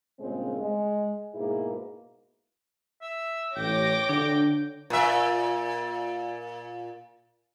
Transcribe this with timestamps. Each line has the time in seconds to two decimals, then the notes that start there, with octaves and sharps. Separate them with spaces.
0.20 G2 A#2 C#3 G#3 C4
0.58 G#3
1.34 G#2 B2 A#3 E4 G#4
3.02 E5
3.56 A1 C#5 G5 D6 A#6
4.09 D3 D4
4.90 A#2 E5